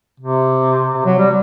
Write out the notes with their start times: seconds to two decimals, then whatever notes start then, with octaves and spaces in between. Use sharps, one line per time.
0.20 C3
0.94 C3
1.05 F#3
1.18 G3